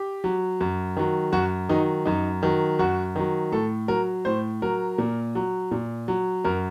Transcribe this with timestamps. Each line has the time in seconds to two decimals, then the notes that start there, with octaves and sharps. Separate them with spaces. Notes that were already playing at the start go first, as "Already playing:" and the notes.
Already playing: G4
0.24 F#3
0.61 F#2
0.97 D#3 F#3
1.32 F#2 F#4
1.69 D#3 F#3 D#4
2.06 F#2 D#4
2.43 D#3 F#3
2.79 F#2 F#4
3.16 D#3 F#3
3.52 A2 A4
3.88 F#3 A#4
4.25 A2 C5
4.62 F#3 A#4
4.98 A#2
5.35 F#3
5.71 A#2
6.08 F#3
6.45 F#2 A#4